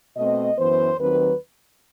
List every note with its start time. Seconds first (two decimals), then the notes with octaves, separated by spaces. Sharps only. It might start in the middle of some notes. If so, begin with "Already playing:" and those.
0.16 B2 A3 C4 D#5
0.58 F#2 E3 B3 C5
0.99 D#2 D#3 F#3 C4 B4